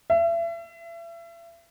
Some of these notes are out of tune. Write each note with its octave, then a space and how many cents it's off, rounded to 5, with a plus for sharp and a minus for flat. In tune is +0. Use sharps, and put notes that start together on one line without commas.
E5 +35